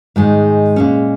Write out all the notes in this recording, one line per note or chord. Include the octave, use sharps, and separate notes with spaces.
G#2 D#3 G#3
A#2 G#3 C#4